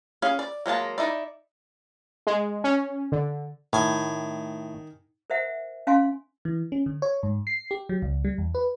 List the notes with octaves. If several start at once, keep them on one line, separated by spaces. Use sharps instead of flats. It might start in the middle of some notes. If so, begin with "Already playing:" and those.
C#4 G#4 F5
D5
F#3 G#3 A#3 A5
D#4 E4 D5
G#3
C#4
D3
A2 D#3 G#5
A#4 C5 E5 F#5
C#4 F5 G#5 C6
E3
C#4
D3
C#5
G#2
C7
G4
F#3
C#2
G3
E2
B4